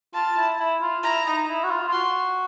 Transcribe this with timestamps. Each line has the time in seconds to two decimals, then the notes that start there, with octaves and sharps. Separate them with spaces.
0.14 F4 A5
0.37 E4
0.59 E4
0.81 F4
1.04 E4 A#5
1.27 D#4
1.48 E4
1.64 F#4
1.71 F4
1.88 F4
1.93 F#4 C6